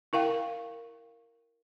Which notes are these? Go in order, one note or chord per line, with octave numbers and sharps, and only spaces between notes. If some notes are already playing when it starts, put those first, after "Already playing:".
E4 A#4 F5 G5